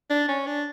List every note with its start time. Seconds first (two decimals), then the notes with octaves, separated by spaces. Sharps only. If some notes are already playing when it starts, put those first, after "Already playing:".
0.10 D4
0.29 C#4
0.47 D4